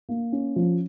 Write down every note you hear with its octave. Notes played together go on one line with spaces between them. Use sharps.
A#3
C#4
F3